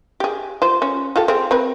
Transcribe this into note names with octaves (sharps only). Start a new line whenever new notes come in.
G4 G#4
F4 C5
C#4
F4 G4 A4
C4 G#4
C4 A#4 B4